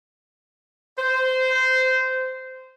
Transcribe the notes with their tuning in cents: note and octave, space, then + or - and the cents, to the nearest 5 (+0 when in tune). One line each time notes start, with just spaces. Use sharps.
C5 -15